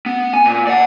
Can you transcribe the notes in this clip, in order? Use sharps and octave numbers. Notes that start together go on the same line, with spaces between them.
B3
G#5
A#2
D5 F#5